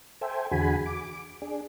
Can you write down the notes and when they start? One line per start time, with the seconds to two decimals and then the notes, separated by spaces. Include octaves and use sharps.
0.21 A4 C5 E5 G5 G#5
0.51 E2 D3 F#4 G#4 G#5 B5
0.86 D6
1.42 D4 G#4